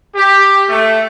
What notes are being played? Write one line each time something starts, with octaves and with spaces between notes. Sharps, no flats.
G4
A3